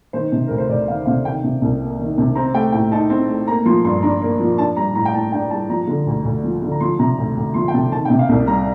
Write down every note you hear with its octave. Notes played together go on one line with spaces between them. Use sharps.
D#3 C5
C3
D2 A#4
C5
D2 D5
D#3 F5
C3 F5
D#3 G5
C3
C2
A#3
D#3
C3
C4 A#5
A3 G5
A2 G5
D#4 A5
C4
A3
A#3 A#5
F3 C6
G2 C6
D4 A#5
A#3
F3
D4 A5
G3 A#5
A2 A#5
G5
A2 A5
D4 G5
G3 A5
F3 A#5
D3
D2
D2
F3
D3
A#5
F3 C6
C3 A#5
D2
D2
F3 C6
G5
C3 A5
D#3 A5
G5
C3
F5
C2
G3 A#5